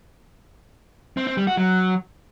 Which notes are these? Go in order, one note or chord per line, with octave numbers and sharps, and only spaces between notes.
C4
C4
G3
F#4
F#3